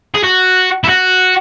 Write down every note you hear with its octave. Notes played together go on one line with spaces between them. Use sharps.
G#4
F#4
E4
F#4